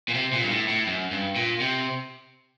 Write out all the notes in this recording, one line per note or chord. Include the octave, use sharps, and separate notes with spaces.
A#2
C3
A#2
G2
A2
A2
F#2
G2
A#2
C3